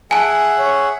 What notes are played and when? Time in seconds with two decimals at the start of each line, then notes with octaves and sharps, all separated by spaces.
0.11 G#4 E5 F#5 G#5 A5
0.59 C#5